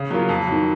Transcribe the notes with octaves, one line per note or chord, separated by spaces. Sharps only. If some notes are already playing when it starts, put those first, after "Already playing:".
Already playing: C#3
F#3 A#3 C#4 F4
F2
D#3 F#3